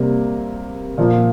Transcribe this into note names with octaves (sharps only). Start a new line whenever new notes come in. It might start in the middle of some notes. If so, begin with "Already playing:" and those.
Already playing: C3 G3 A#3
A#2 F3 A#3